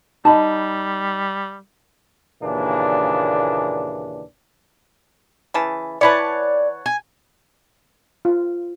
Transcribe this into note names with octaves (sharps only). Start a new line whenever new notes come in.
G3 D#4 D#5 A5 B5
D#2 A#2 C#3 E3 D4
C#3 E3 A5
E3 E4 B4 C#5 D5 F#5 A5
G#5
F4